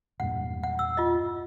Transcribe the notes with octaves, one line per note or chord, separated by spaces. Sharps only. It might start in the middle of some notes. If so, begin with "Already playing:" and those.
E1 G2 A#2 F#5
F#5
E6
F4 D#5